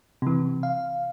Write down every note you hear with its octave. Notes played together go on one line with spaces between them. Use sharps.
C3 E3
F5